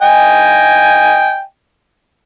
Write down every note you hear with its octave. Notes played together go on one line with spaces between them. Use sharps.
D#5 G5 G#5